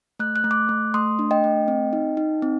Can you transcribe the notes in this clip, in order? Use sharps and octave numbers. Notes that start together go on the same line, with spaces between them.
A3 F#6
F#6
A3
D6 F#6
A3
A3 C6 D#6
D4
D#5 G5
A3
C4
D#4
D#4
C4